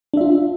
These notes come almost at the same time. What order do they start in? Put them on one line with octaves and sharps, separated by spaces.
D4 E5 F4